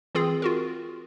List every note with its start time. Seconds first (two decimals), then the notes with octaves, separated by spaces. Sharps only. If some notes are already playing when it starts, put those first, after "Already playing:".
0.15 E3 C4 F4 G#4
0.42 F4 F#4 A#4